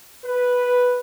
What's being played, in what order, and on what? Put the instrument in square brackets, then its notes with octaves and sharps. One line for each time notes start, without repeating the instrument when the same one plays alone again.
[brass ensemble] B4